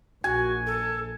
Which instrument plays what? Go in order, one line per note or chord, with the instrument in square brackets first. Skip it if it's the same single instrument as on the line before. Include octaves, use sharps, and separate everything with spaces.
[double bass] A#1 [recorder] F#4 [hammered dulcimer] G#5
[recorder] A4